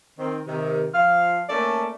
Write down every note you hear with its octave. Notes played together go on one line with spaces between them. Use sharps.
D#3 C4
C3 D#3
F3 F5
A3 A#3 C#4 A4 D5